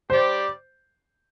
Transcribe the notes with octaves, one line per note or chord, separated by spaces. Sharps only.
G3 D4 G4 C5 D5